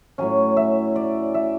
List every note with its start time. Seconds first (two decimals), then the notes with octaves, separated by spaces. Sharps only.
0.18 A2 F#3 C#4 G#5
0.57 E5
0.96 D5
1.34 E5